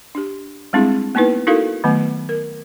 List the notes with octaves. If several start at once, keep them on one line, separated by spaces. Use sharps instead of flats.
D4 G4
G3 G#3 C4 D4 E4 G#4
A#3 B3 D#4 E4 B4
D#4 E4 F#4 A4 A#4 F5
D#3 F#3 A3 B3
A#4